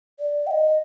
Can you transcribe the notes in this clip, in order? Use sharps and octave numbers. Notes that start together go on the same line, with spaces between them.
D5
G5
D#5